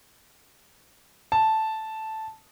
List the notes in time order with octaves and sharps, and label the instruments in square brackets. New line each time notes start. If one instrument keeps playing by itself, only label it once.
[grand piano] A5